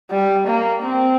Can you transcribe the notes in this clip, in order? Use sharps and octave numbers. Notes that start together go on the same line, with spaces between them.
G3
A#3
C4